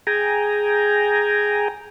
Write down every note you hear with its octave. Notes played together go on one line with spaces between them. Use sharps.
G#4 G5 G#5 A#5